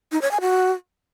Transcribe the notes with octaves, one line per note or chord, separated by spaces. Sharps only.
D#4
C#5
G#5
F#4